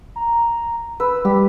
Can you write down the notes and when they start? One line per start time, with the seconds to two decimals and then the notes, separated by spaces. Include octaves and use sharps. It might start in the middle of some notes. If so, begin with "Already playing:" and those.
0.16 A#5
1.00 B4 E6
1.25 G3 G4